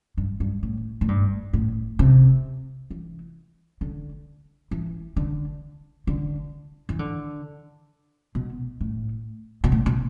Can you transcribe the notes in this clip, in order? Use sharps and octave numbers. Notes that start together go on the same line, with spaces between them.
G2
G2
A2
A2
G2
A2
C3
E3
D3
E3
D3
D3
E3
D3
B2
A2
B2
A2
B2